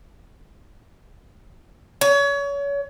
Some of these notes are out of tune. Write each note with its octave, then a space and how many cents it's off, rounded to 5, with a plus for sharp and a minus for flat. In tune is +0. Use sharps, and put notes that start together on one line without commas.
C#5 +30